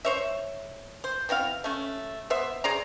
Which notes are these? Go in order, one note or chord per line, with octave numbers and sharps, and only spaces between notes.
C5 C#5 E5
C5
B3 C4 E4 F5
A3 C#4
B3 C5 E5
G#4 C5 D5 A#5